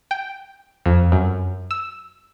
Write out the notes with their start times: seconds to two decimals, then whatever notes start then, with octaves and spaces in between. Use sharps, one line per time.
0.11 G5
0.86 F2
1.12 F#2
1.71 E6